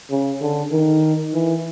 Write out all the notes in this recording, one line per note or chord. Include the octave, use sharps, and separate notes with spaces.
C#3
D3
D#3
E3